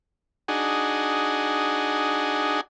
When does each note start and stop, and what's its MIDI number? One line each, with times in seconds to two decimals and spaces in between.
0.48 2.61 62
0.48 2.61 63
0.48 2.61 66
0.48 2.61 68